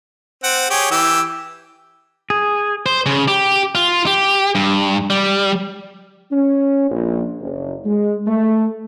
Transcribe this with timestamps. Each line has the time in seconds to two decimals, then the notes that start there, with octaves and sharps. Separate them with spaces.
0.44 C4 F#5
0.70 G4 G#4 C#5
0.91 E3 G4 E6
2.30 G#4
2.86 C5
3.06 C#3
3.28 G4
3.75 F4
4.06 G4
4.55 G2
5.10 G3
6.32 C#4
6.90 A#1
7.41 F#1
7.85 G#3
8.27 A3